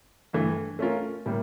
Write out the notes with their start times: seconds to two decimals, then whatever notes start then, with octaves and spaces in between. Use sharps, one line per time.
0.33 G2 E3 A3
0.79 A3 C#4 F4 A#4
1.26 A2 G3 A#3